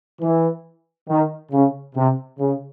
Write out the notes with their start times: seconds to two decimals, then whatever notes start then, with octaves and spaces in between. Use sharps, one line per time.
0.22 E3
1.08 D#3
1.52 C#3
1.95 C3
2.39 C#3